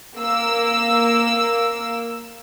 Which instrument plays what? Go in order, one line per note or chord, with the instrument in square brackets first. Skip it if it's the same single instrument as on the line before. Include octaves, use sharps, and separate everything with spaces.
[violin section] A#3 E6